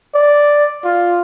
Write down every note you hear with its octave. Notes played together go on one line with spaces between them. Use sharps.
D5
F4